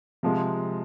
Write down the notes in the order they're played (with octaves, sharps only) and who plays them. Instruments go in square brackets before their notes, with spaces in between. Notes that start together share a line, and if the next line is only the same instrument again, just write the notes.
[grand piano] C3 F3 G#3